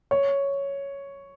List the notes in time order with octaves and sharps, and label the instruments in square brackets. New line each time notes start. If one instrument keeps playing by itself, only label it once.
[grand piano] C#5